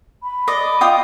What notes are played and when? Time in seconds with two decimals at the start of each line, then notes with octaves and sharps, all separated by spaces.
0.23 B5
0.48 D5 D#5
0.81 F4 G5 D#6